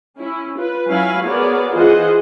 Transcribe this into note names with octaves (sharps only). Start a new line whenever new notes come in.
C#4 E4
F4 B4
F#3 C#4 E4 F5 G#5 B5
B3 F#4 G#4 A#4 C#5 D5
E3 F4 G#4 C5 D#5 F#5